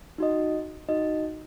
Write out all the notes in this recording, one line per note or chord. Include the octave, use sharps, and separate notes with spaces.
D#4 F#4 D#5
D#4 F#4 D#5